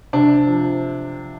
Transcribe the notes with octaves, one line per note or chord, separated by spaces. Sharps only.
C3 D4
F3